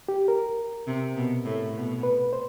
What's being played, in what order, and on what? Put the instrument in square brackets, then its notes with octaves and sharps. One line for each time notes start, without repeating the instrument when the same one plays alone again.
[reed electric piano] G4
A#4
[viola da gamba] C3
B2
A2
B2
[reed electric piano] B4
C5